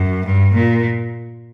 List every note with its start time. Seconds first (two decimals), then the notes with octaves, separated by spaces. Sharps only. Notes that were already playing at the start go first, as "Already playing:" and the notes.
Already playing: F#2
0.25 G2
0.54 A#2